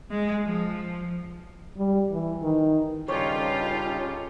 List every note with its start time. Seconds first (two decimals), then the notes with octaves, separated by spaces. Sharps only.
0.11 G#3
0.43 F3
1.77 G3
2.11 E3
2.42 D#3
3.08 G2 C#3 C#4 D#4 F4 G4 A4 C#5